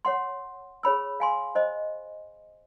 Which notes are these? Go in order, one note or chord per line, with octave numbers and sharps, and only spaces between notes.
C#5 F#5 C6
G#4 C#5 B5 E6
F5 G#5 C6
C5 D#5